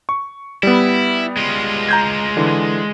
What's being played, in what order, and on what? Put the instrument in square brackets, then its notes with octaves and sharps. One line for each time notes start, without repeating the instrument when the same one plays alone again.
[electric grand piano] C#6
[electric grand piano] G3 B3 [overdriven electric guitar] E4
[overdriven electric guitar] G#3 F4
[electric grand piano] A#5 G6 G#6
D3 E3